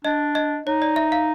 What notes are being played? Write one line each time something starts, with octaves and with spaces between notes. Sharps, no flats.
D4 D#5
D#5
D#4 C#5
D5
E5
F5